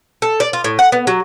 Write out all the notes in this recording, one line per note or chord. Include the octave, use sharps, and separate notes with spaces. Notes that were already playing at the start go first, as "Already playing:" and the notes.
A4
D5
F4
A2
F#5
B3
F#3